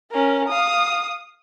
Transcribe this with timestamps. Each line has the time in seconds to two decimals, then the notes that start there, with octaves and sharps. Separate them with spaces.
0.12 C#4 A#4
0.48 F5 D#6